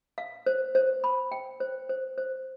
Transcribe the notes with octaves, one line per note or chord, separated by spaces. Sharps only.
F5
C5
C5
B5
G5
C5
C5
C5